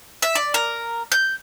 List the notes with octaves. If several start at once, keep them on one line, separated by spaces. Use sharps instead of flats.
E5
D5
A#4
G6